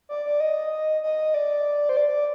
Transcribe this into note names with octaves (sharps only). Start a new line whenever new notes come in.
D5
D5
D#5
D#5
D5
C5
D5